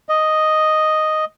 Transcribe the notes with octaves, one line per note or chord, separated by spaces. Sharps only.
D#5